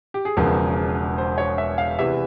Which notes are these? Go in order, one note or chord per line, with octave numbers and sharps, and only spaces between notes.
G4
G#4
E1 E2 C#3 F3 A#4
C5
C#5
E5
F5
E2 C3 E3 E5